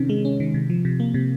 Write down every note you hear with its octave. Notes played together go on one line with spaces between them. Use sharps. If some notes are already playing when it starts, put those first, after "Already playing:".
Already playing: C3 D#3 C#4
G#3
C#4
D#3
C3
F3
C3
A#3
C3